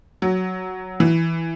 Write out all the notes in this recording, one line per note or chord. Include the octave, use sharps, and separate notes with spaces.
F#3
E3